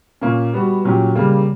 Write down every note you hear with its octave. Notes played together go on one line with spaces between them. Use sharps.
A#2 A#3 C#4
G3 B3 F#4
A#2 F#3 C#4 G4
C#3 G3 A#3